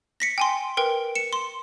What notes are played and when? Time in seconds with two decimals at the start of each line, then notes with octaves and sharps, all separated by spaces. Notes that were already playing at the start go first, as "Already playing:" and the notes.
0.20 A#6 B6 C#7
0.38 G5 G#5 C6
0.77 A#4 B4 G5
1.15 C#7 E7
1.33 C6